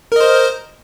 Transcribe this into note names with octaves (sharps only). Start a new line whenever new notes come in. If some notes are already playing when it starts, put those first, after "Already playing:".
A#4 C5 D#5